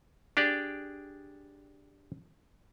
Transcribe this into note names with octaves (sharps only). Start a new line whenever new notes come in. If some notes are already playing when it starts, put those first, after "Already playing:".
D4 G4 G#4 D5